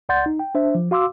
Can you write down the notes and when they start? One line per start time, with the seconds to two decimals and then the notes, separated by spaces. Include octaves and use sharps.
0.09 C#2 D5 F#5 C6 G6 A6
0.26 D#4
0.39 G5
0.55 D4 C5 E5
0.75 F3
0.91 F#4 F5 C6 D6 E6